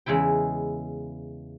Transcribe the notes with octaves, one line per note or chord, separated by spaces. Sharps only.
E2 C#3 G#3 E4 G5